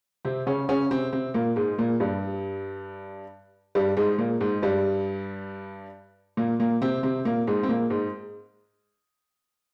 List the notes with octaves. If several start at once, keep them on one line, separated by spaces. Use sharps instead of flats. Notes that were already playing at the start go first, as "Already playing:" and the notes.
C3 C4
C#3 C#4
C#3 C#4
C3 C4
C3 C4
A#2 A#3
G#2 G#3
A#2 A#3
G2 G3
G2 G3
G#2 G#3
A#2 A#3
G#2 G#3
G2 G3
A#2 A#3
A#2 A#3
C3 C4
C3 C4
A#2 A#3
G#2 G#3
C4
A#2 A#3
G#2 G#3